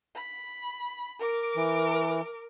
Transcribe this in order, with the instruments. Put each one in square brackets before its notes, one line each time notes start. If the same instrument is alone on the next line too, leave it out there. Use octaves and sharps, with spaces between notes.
[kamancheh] B5
A#4 D6
[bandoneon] E3